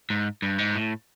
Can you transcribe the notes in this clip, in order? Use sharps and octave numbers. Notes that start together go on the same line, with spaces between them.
G#2
G2
G#2
A2